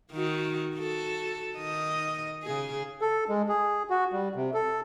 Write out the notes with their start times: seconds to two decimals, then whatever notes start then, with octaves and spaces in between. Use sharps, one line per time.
0.13 D#3 F#4
0.76 F#4 A4
1.55 D#3 D#5
2.43 C#3 G#4
3.01 A4
3.29 G#3
3.49 G#4
3.90 F#4
4.13 G3
4.36 C3
4.54 A4